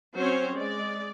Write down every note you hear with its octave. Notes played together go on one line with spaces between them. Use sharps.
F#3 C4 C#4 C5 C#5
G#3 D5